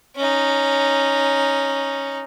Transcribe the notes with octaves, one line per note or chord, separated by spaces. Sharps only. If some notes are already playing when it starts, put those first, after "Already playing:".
C#4 D#4